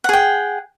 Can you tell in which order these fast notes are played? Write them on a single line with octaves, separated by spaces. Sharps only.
F#5 G#4 G5